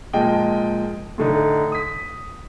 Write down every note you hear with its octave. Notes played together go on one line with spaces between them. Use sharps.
A#2 F3 G#3 D#5 G5 A5
A2 D3 D#4
D#6 B6